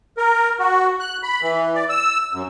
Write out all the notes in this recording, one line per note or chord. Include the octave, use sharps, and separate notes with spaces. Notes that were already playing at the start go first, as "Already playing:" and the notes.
A#4
F#4
F#6
B5
E3
D5
E6
F#2